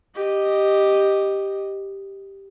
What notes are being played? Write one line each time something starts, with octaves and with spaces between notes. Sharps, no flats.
G4 D#5